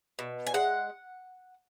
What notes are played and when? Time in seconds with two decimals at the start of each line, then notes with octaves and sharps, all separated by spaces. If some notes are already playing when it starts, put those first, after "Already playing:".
0.19 B2
0.47 G#5
0.54 G#3 F#5